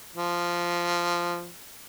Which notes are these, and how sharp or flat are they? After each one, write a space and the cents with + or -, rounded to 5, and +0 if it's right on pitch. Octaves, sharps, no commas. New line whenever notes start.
F3 -5